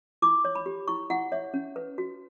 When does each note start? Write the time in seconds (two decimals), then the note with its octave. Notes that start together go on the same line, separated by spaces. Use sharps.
0.22 E4 D6
0.45 C#5
0.55 B5
0.66 G4
0.88 E4 C#6
1.10 E4 F#5
1.32 C#5 E5
1.54 C#4
1.76 B4
1.98 F#4